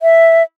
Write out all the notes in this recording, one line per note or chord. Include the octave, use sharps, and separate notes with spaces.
E5